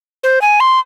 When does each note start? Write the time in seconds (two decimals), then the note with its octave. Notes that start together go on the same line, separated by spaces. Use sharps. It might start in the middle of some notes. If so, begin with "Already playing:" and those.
0.23 C5
0.42 G#5
0.60 C6